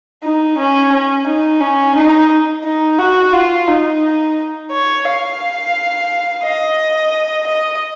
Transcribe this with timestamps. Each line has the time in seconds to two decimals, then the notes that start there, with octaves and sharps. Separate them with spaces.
0.23 D#4
0.58 C#4
0.92 C#4
1.26 D#4
1.60 C#4
1.95 D#4
2.64 D#4
2.99 F#4
3.33 F4
3.67 D#4
4.71 C#5
5.05 F5
6.43 D#5
7.47 D#5